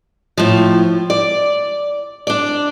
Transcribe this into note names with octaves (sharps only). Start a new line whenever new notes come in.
A2 F3
D5
D4 D5